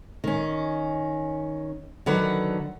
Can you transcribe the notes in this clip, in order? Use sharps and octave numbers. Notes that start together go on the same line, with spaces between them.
D#3 C#4
D3 D#3 F#3 B4 F#5